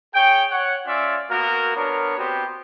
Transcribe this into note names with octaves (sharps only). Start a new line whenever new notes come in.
G#4 C#5 G5
C#5 F#5
C#4 F4 D5 E5
A#3 B3 F#4 A#4
B3 D4 A#4 C#5
B3 C4 F#4 G4